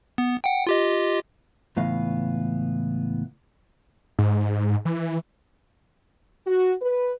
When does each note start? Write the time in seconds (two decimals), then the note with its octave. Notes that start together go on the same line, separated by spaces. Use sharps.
0.18 B3
0.44 F#5 G5
0.67 F4 G4 D#5
1.77 C#2 A2 E3 B3 F5
4.19 G#2
4.85 E3
6.47 F#4
6.82 B4